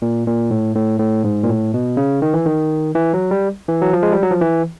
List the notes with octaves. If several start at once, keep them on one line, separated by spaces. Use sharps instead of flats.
A#2
A#2
A2
A2
A2
G#2
A#2
A2
B2
C#3
D#3
E3
D#3
E3
F#3
G3
E3
F#3
F3
G#3
G3
F#3
F3
E3